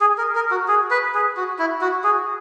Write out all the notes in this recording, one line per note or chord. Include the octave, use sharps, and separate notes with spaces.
G#4
A#4
A#4
F#4
G#4
B4
G#4
F#4
E4
F#4
G#4